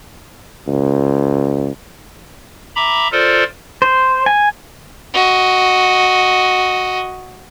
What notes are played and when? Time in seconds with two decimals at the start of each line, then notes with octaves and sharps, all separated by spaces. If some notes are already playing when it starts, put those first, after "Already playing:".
0.67 C#2
2.76 E5 A#5 B5 D6
3.12 F4 A4 A#4 C5 D5
3.82 C5
4.26 G#5
5.14 F#4 D#5